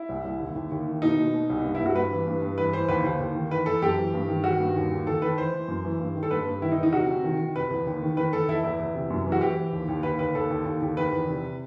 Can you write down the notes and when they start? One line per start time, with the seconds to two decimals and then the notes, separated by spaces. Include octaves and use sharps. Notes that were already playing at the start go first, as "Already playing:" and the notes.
Already playing: E4
0.09 C2
0.25 C2
0.40 D#2
0.55 D#2
0.72 D#2
0.87 D#3
1.02 B2 D#4
1.18 B2
1.34 B2
1.50 C2
1.64 G2
1.75 G2 E4
1.86 F#4
1.95 G2 B4
2.11 E3
2.27 G2
2.42 G2
2.58 E3 B4
2.73 E3 C5
2.88 D#2 B4
3.04 D#2 C5
3.20 D#2
3.35 D#3
3.51 E3 B4
3.66 E3 A4
3.82 F#2 G4
3.97 E3
4.14 G2
4.28 D#3
4.44 D#3 F#4
4.60 G2
4.76 D#2
4.91 D#2
5.07 D#3 A4
5.22 D#3 B4
5.38 E3 C5
5.53 E3
5.68 F#2
5.85 E3
6.00 G2
6.16 D#3
6.23 A4
6.31 G2 B4
6.46 G2
6.62 D#3 E4
6.72 D#4
6.78 E2
6.83 D#4
6.92 C3 F#4
7.09 C3
7.24 D#3
7.39 D#3
7.54 C3 B4
7.71 E2
7.87 D#2
8.02 D#3
8.17 D#3 B4
8.32 D#3 A4
8.48 E2 E4
8.64 E2 E4
8.79 E2
8.95 C3
9.10 F#2
9.27 E3
9.32 F#4
9.41 E3 G4
9.57 E3
9.73 D#2
9.88 D#2
10.03 D#2 B4
10.19 D#2 B4
10.35 D#2 A4
10.50 D#2
10.65 D#2
10.82 D#2
10.97 D#3 B4
11.12 E2
11.28 C3